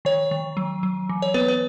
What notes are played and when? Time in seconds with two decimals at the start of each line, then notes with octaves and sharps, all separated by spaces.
0.05 D#3 C#5
0.31 D#3
0.57 F#3
0.83 F#3
1.09 E3
1.22 C#5
1.34 B3 B4
1.48 B4